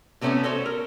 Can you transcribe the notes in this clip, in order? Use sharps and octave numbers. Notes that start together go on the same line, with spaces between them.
C3 A3 B3 C#4 A4 G#5
F#4 A4 C5 C#5
A#4